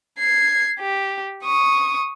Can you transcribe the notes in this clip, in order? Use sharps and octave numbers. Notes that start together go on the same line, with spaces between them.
G#6 C7
G4
C#6 D#6